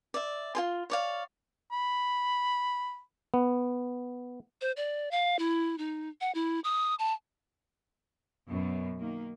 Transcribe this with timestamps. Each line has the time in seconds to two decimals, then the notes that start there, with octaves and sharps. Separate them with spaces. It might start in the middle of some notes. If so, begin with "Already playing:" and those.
0.14 D5 E5
0.55 F4 G#4 C6
0.90 C#5 D5 F5
1.72 B5
3.34 B3
4.61 C5
4.77 D5
5.11 F5
5.39 E4
5.78 D#4
6.21 F#5
6.35 E4
6.64 D#6
6.99 A5
8.48 F#2 B2
8.98 D#3 A#3